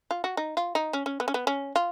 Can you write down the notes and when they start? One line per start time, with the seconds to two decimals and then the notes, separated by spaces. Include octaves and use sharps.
0.11 F4
0.24 F#4
0.37 D#4
0.57 F4
0.75 D#4
0.93 C#4
1.06 C#4
1.20 B3
1.28 C#4
1.34 B3
1.47 C#4
1.76 F4